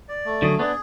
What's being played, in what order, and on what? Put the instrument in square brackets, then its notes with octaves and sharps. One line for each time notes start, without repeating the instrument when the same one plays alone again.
[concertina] D5
A3
[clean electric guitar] D3 F#3 [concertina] G#4
[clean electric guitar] B3 D4 [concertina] G#4